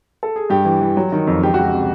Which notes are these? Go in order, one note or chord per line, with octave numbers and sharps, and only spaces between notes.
A4
G#4
G2 G4
E3
E3
F#3
D#3
F2
C#2 G4
C#2 F#4
G4
C3